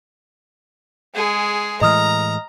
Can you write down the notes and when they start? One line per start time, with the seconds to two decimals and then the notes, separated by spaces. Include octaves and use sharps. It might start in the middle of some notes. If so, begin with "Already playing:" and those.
1.15 G#3 G#4
1.81 A2 E3 G#3 D#5 A#5 D#6 F6